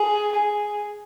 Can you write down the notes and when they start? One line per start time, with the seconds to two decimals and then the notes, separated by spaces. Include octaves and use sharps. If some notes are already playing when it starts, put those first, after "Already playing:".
Already playing: G#4
0.33 G#4